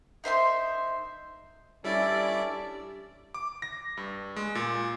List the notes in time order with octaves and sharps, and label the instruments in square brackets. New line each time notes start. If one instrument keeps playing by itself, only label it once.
[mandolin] D#4 C5 E5 C6
[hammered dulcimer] G2 A4 [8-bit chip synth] G3 E4 E5 [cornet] C#4 [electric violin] D5
[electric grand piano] D6
A#6
G2
G#3
A#2